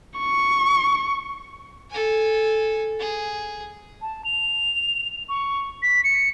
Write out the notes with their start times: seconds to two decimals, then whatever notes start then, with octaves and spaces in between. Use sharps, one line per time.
0.18 C#6
1.91 A4 G#5
3.00 G#4
4.02 A5
4.25 F7
5.29 C#6
5.83 B6
6.04 C#7